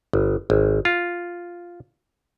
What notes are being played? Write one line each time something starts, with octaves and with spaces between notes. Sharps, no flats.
G1
G#1
F4